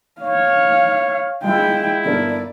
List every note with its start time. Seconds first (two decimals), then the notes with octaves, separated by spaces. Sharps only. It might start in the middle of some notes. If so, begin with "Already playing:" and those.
0.22 C#5 F5
1.44 G#3 E4 F4 G#4 G5
2.05 G1 D4 A#4 D5